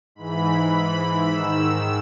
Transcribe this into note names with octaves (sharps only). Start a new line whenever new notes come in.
G#2 E3 B5
G#2 D#3 E6